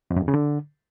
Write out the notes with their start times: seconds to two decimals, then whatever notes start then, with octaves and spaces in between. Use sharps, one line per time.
0.11 F2
0.16 F#2
0.22 E2
0.28 C#3
0.34 D3